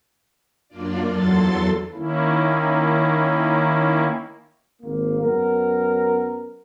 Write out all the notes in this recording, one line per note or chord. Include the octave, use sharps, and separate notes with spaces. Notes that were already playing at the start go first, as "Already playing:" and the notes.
F#2 A#3 D4 F4 D5
E2 F#3 A4 C6 A6
D#3 A#3 C#4 E4
G#1 A#3
F#2 B3 A#4